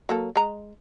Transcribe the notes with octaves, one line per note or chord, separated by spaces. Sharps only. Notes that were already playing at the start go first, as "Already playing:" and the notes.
F#3 A#3 A4
G#3 A#5